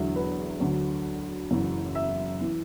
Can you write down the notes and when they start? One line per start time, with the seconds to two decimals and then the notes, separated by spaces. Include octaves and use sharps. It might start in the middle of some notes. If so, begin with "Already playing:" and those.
Already playing: E1 E2 D3 F#3 E5
0.16 B4
0.60 D2 D3 F#3
1.51 F#1 F#2 E3
1.95 E5
2.41 E3